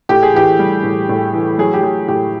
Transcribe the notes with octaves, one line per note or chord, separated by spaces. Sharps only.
A2 G4
G#4
E3 G4
G3
A2
A2
E3
F#3 G#4
G4
F#3 G#4
A2 G4